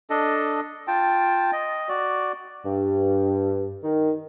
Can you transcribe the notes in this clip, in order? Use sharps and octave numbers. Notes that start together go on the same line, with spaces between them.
D4 A4 D#5
F4 G5 A5
D#5
F#4 D5
G2
D#3